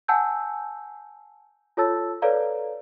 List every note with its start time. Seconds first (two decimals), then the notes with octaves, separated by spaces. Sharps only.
0.08 F#5 G#5 A5 E6 G6
1.77 F4 A4 C#5 A5 E6 A6
2.22 A4 B4 C#5 D5 F5 A#5